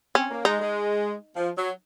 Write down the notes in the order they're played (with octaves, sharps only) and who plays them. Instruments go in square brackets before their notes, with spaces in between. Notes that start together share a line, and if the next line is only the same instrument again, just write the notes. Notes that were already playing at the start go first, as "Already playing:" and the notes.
[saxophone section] C4 [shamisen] C#4
[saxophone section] A#3
[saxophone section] G#3 [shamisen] D#4
[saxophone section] G#3
F3
F#3